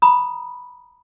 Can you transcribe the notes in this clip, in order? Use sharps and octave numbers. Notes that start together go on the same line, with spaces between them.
A#5 B5 D#6